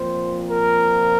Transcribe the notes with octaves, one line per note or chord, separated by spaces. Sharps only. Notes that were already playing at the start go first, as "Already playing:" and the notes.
Already playing: A#2 F3 C4 C5
A#4